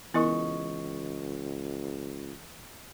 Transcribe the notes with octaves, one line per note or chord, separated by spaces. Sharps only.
C#2 E3 B3 E4 A#4 D#5 C#6